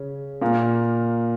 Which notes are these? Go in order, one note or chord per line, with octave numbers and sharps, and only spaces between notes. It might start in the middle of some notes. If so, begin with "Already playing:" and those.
Already playing: C#3 C#4
A#2 A#3